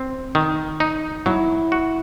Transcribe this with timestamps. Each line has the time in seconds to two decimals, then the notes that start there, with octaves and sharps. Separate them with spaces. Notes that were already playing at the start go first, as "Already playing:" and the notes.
Already playing: C4
0.35 D#3
0.80 D#4
1.26 F#3 E4
1.72 F#4